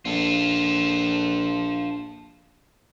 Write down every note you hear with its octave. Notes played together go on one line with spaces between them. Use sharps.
A#1 F4 A4